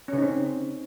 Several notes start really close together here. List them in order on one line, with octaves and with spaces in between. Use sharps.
C#4 C#3 D#4 C4